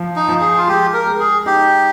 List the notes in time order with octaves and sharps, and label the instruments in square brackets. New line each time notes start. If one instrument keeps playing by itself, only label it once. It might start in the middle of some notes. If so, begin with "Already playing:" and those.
Already playing: [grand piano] F3
[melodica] D#4
[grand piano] F3
[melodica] G#4
F4
[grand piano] G#3 [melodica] G4
[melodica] A#4
[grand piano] G#3
[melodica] G#4
[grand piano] D#4 [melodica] G4